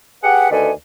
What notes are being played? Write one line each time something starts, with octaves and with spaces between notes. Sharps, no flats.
G4 G#4 B4 F#5
D2 D#3 A4 B4 D5 G#5